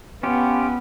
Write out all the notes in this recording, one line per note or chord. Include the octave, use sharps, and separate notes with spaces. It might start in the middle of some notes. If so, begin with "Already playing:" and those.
B3 C#4 F4 G4